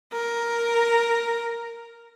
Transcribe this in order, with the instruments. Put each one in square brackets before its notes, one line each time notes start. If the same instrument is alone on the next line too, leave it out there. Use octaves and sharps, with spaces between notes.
[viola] A#4